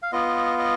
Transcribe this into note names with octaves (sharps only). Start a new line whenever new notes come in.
F5
B3 F4 D#5
D#5